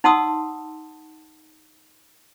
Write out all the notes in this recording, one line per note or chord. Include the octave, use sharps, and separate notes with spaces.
D#4 F#5 A5 C6 D#6 E6